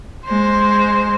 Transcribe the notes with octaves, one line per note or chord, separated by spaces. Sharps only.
G#3 C5